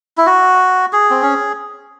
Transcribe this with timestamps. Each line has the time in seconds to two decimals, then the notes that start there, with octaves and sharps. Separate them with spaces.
0.18 E4
0.26 F#4
0.93 G#4
1.10 C4
1.22 C#4